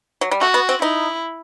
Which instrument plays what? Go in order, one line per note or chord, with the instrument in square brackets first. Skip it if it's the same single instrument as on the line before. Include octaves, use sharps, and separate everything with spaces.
[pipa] F#3
G3
[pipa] A3 [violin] F#4
[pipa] B3
C4
[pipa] D#4 [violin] E4